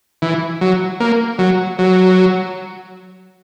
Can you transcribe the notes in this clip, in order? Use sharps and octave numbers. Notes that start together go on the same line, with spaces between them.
E3
F#3
A#3
F#3
F#3